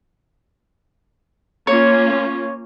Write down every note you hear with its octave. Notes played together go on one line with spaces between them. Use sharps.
A#3 C#4 F4 C#5